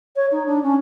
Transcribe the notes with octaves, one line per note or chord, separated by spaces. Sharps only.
C#5
D#4
D4
C#4